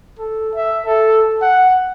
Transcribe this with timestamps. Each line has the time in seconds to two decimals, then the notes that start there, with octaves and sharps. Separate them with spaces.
0.19 A4
0.54 E5
0.86 A4
1.41 F#5